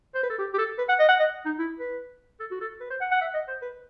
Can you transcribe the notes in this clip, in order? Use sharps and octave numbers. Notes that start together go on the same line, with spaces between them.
C5
B4
A4
G4
G4
A4
B4
F#5
D#5
F#5
D#5
D#4
E4
B4
A4
F#4
A4
B4
C5
F#5
F#5
E5
D#5
C5
B4